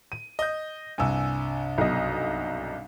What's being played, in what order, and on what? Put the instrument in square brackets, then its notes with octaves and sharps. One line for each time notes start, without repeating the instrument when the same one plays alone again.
[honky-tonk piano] D#7
[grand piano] D#5 G6
[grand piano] C2 G2 [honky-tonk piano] G#5 E6
[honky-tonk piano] B1 D#5